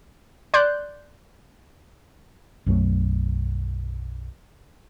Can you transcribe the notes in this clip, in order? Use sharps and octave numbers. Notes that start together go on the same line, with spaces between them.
D5 C6 F#6 G6
B1 F#2 F#3 A3